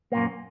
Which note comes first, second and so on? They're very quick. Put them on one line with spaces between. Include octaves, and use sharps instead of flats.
A#3 A#2 F#2